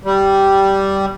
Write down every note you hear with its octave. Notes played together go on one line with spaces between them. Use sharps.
G3